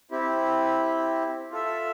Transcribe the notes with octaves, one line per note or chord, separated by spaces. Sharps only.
C4 E4 G4
F4 A4 E5